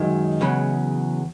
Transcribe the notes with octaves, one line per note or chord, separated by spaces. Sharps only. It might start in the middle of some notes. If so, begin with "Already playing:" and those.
Already playing: F#2 D#3 F#3 G#3
E2 C#3 F#3